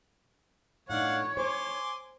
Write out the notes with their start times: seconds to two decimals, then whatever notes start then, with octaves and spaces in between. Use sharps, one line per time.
0.90 A2 D4 D#4 C#5 F5 F#5
1.37 C5 G#5 C6 D6